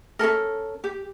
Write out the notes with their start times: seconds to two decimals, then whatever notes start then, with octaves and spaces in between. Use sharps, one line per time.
0.19 C#4 D4 A4 A#4
0.84 G4